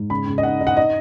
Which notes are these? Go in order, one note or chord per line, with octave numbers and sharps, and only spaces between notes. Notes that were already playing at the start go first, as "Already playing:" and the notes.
Already playing: G#2
C#3 B5
C#3
D#5
D#4 F#5
D#4
F#5
D#4 D#5